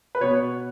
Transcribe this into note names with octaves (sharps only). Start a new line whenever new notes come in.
B4
B2 B3 C#5